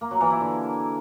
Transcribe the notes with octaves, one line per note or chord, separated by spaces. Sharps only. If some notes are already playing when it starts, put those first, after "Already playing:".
A#3
F#3
E3
E4
D3